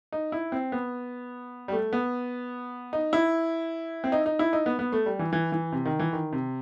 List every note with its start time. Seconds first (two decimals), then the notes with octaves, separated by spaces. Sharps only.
0.12 D#4
0.32 E4
0.52 C4
0.72 B3
1.68 G3
1.72 A3
1.93 B3
2.93 D#4
3.13 E4
4.04 C4
4.12 D#4
4.26 D#4
4.39 E4
4.53 D#4
4.66 B3
4.79 B3
4.92 A3
5.06 G3
5.19 E3
5.33 E3
5.52 E3
5.72 C3
5.85 D#3
5.99 E3
6.13 D#3
6.32 C3